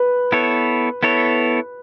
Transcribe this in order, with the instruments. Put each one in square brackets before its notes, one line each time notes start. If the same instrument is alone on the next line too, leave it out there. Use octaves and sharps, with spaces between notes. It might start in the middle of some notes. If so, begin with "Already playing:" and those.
Already playing: [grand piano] B4
[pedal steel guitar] B3 E4 A4 C#5
B3 E4 A4 C#5